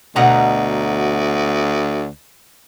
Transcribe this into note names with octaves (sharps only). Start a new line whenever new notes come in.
D2 B2 F#5 A#5